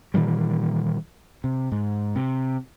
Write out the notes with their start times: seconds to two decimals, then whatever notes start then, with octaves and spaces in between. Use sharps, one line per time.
0.14 A#2 D#3 E3 G3
1.44 C3
1.72 G#2
2.16 C3